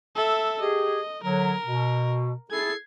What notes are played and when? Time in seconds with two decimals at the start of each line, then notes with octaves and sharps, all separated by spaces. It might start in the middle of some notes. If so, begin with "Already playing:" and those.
0.15 A4 E5
0.60 G4 G#4 D#5
1.23 D3 F#3 A#4
1.66 B2
2.51 E4 G#4 A4 G#6 C7